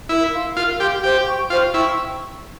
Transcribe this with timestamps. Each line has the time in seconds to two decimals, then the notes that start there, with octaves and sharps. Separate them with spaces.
0.09 E4 A#4
0.33 F5 C6
0.57 F4 A#4
0.80 G4 C6
0.84 F5
1.03 G4 C5
1.26 G5 C#6
1.50 F4 C5
1.74 E4 G5 C#6